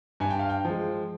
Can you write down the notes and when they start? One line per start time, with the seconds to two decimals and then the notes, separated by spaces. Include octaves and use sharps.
0.20 G2 G#5
0.30 G5
0.39 F5
0.49 G5
0.65 F3 G#3